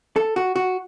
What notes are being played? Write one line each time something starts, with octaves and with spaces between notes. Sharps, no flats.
A4
F#4
F#4